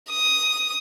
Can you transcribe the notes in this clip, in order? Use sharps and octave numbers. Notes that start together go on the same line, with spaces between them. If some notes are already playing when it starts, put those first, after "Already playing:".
D#6